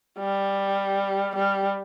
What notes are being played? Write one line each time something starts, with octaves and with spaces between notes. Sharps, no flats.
G3
G3